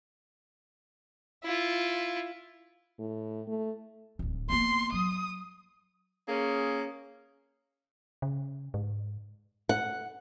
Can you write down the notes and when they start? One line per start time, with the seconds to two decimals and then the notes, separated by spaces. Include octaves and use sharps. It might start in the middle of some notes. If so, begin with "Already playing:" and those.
1.44 E4 F4
2.99 A2
3.48 A3
4.19 D1 D2
4.50 A#3 B3 C6
4.92 F#3 D#6
6.28 A#3 C#4 G#4
8.22 C#3
8.74 G#2
9.69 F#5